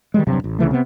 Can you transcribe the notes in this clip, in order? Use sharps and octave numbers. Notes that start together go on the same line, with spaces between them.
D#3 G3 G#3
E1 G2 C3 F#3
A1
C2 C#3 E3 A3
C3 B3